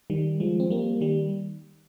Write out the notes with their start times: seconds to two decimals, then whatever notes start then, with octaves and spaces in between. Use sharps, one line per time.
0.10 D#3 G3
0.40 F3 G#3
0.60 C4
0.70 G3 A#3
1.01 D#3 G3